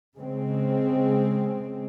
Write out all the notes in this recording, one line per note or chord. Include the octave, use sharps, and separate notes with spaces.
C#3 G#3 C4